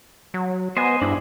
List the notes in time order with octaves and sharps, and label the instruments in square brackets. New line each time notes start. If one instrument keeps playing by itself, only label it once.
[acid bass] F#3
[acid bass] B3 [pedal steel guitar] C5 D#5 G#5
[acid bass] G2 [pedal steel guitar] D4 E4 G#4